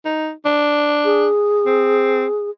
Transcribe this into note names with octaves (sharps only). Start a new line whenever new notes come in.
D#4
D4
G#4
C4